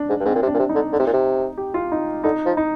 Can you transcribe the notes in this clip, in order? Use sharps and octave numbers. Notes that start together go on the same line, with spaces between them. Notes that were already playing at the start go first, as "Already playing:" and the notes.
Already playing: D4
G#2
G2
G#2 C4
A#2
C3
D4
A#2
C3
D#4
D3
D3
C3
A#2
C3
G4
F4
D#4
D3 D#4
F3
D#4